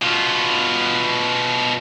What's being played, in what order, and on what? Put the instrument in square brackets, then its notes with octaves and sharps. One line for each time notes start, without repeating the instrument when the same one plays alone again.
[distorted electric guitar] B2 F4